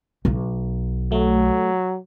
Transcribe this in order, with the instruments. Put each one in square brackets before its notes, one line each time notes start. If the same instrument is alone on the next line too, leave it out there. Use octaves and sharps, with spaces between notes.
[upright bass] B1
[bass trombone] F#3 [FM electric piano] A3